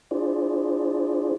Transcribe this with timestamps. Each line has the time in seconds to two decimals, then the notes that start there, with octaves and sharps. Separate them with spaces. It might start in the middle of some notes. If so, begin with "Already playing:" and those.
0.11 D4 E4 F4 G#4 C5 D5